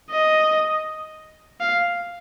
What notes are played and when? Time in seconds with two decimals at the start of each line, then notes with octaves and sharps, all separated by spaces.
0.11 D#5
1.61 F5